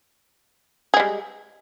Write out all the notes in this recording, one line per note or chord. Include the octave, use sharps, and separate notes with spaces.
G3 G#3 G#4